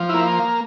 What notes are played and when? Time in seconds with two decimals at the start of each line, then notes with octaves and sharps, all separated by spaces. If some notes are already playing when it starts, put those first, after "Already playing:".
Already playing: F3
0.09 E4
0.14 A#3